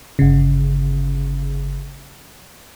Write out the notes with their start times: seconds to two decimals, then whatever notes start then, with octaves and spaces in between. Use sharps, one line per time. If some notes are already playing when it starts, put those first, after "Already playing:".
0.19 G1 C#3